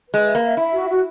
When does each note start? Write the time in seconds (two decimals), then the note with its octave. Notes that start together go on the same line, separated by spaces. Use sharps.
0.09 G#3 B4
0.24 E5
0.35 A#3
0.41 E5
0.57 E4 E5
0.73 F#4
0.88 F#4